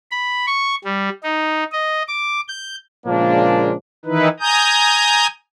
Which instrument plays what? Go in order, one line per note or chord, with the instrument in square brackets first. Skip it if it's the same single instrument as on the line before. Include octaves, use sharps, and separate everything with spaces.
[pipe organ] B5
C#6
G3
D#4
D#5
D6
G6
[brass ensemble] A#2 C#3 F3 G#3 A#3 D4
[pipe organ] D#3 E3 D#4 E4 B4
G#5 A#5 D#6 G6